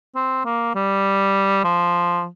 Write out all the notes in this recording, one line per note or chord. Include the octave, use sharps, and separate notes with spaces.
C4
A#3
G3
F3